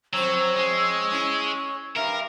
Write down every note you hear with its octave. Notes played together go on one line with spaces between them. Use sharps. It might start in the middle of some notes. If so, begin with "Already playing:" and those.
F2 F#3 C4 C5 C#5 E6
G#3
C#4 E4
G2 A#4 E5 F5